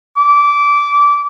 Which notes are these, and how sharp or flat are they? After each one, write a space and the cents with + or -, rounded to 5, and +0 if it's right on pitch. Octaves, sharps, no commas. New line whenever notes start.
D6 -20